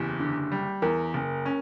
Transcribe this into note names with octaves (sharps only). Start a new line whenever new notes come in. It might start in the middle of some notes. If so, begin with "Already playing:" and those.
Already playing: F#1 E2 G4
D3
G3
E2 A#4
F#1
C#4